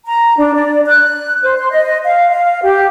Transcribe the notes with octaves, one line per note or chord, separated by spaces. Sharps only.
A#5
D4
D5
F#6
C5
C6
D#5
F5
F5
G4